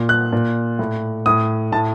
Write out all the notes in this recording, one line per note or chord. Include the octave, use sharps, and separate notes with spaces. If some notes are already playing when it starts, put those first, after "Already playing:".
Already playing: A#2
F#6
A#2
A2
A2 D#6
A2 A5